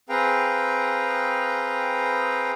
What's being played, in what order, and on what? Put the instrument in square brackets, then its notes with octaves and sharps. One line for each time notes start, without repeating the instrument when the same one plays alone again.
[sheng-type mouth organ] C4 G#4 B4 F5 G5 A#5